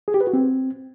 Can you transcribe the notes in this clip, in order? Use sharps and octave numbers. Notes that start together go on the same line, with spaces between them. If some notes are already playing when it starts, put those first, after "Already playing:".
G#4
G4
B4
F#4
C4